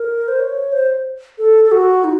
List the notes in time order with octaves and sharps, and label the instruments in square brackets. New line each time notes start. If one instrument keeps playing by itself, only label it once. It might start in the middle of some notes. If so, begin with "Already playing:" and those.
Already playing: [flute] A#4
C5
C#5
C5
A4
A4
F#4
D#4